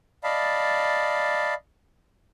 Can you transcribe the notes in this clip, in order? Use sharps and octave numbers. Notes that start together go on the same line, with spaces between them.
D5 D#5 F5 A5 B5